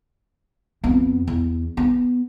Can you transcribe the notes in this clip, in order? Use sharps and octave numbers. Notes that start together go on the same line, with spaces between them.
F2 B3
E2
B3